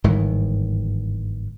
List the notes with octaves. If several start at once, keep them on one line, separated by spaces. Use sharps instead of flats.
G1 G#2 D#3 E3